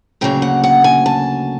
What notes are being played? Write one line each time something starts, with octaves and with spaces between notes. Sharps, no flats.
D2 C#3 F#3 A#3 G5
F#5
F#5
G#5
A5